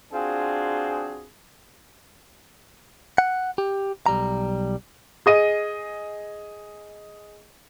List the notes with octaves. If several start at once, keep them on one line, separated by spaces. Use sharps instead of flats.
C4 D4 F4 F#4 G#4
F#5
G4
B1 G3 A#5
G#4 D#5 D#7